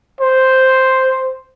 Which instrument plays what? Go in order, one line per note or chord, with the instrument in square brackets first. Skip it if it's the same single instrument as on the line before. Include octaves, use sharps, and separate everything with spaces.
[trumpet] C5